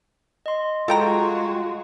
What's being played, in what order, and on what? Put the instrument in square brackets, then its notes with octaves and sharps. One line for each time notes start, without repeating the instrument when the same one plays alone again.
[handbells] D#5 C6
[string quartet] G#3 F#4 [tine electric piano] F4 [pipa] A4 G5 A#5